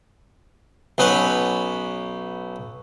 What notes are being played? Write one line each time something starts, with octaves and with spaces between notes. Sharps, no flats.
B1 B3 C#4 B4